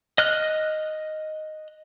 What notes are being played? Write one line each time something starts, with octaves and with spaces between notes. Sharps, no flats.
D#5 F6 F#6